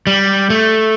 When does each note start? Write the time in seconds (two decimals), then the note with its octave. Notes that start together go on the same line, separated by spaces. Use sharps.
0.07 G3
0.50 A3